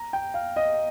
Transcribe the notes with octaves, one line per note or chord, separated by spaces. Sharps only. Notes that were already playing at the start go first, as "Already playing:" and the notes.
Already playing: A#5
G5
F5
D#5